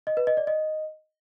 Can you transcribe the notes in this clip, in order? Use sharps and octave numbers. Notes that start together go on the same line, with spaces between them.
D#5
B4
D#5
D5
D#5